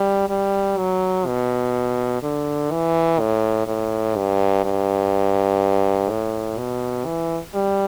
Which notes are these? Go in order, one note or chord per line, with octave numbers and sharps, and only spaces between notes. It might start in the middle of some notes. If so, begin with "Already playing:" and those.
Already playing: G3
G3
F#3
B2
D3
E3
A2
A2
G2
G2
A2
B2
E3
G3